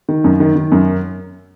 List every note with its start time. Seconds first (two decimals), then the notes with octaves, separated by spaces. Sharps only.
0.09 D#3
0.24 F#2
0.40 D#3
0.56 D#3
0.72 F#2